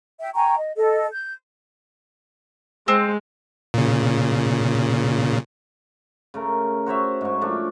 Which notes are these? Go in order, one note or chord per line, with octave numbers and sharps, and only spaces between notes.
E5 G5
G5 G#5 A#5 C#6
D#5
A4 D#5
G6
G#3 C4
A#2 C#3
C#3 A3 A#4
F#4 C5 C#5 E5
G#2 C#6
F3 A3 C#4 D4